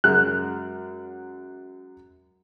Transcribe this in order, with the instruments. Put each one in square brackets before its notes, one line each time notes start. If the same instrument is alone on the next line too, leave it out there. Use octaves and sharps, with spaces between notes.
[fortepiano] F#2 F#3 G#3 F#4 F6 F#6